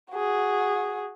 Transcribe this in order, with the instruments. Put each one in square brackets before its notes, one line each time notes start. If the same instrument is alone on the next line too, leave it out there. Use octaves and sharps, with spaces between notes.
[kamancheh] F#4 G#4